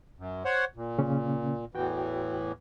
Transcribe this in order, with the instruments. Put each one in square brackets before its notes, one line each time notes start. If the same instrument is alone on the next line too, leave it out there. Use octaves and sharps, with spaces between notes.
[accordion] F#2
C5 C#5 F#5
A#2
[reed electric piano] C#3 A#3 C#4
[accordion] E2 A2 E3 [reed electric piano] F#4 G5